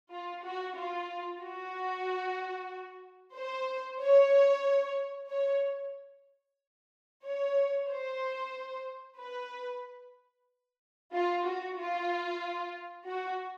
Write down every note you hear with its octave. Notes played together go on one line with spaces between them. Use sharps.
F4
F#4
F4
F#4
C5
C#5
C#5
C#5
C5
B4
F4
F#4
F4
F#4